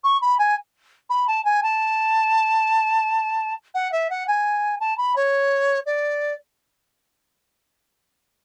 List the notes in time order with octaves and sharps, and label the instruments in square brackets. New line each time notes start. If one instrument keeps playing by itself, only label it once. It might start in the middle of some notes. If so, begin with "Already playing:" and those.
[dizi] C#6
B5
G#5
B5
A5
G#5
A5
F#5
E5
F#5
G#5
A5
B5
C#5
D5